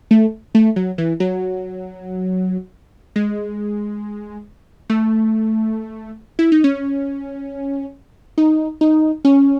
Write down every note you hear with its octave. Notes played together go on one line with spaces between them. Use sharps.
A3
A3
F#3
E3
F#3
G#3
A3
E4
D#4
C#4
D#4
D#4
C#4